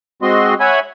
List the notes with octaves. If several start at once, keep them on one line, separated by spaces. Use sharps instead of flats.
G#3 C4 F#4 D#5 C6
C#5 E5 F#5 G#5 B5